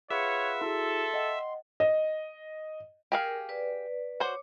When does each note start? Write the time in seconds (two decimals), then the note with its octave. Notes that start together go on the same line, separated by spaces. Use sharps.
0.10 F4 G#4 B4 C#5 E5 F#5 C#7
0.61 E4 F#4 G#4 A4 C6
1.14 D#5 F#5 G5
1.80 D#5
3.12 G4 G#4 A#4 F5
3.49 B4 D5
4.20 F#4 C5 C#5 D6